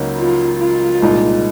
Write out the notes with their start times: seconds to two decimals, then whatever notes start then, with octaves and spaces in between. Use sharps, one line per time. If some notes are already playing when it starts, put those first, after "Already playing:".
Already playing: C#2 C#3 F#3 A#3 D#4
0.18 F4
0.60 F4
1.02 C2 A#2 G#3 D#4